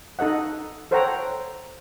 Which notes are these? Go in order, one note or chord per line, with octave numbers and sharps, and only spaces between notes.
D#4 A4 D#5 F#5
A4 C5 C#5 F#5 G5 A#5